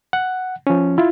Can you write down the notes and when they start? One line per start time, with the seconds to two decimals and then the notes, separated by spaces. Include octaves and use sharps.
0.13 F#5
0.67 F3 C#4
0.98 E4 F4